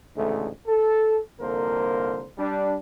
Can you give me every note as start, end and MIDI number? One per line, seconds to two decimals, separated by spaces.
0.15 0.48 33
0.15 0.48 38
0.15 0.48 44
0.15 0.48 49
0.15 0.48 57
0.67 1.18 69
1.39 2.25 36
1.39 2.25 41
1.39 2.25 50
1.39 2.25 58
1.39 2.25 70
1.39 2.25 72
2.38 2.74 55
2.38 2.74 62